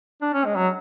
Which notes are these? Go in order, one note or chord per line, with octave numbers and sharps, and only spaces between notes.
D4
C#4
G#3
F#3